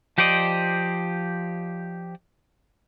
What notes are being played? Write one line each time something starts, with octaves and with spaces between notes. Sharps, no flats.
F3 G4 C5 D5 D#5